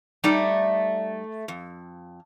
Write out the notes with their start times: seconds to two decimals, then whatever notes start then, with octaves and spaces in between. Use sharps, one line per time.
0.24 G3 A3 D#4 D5
1.48 F2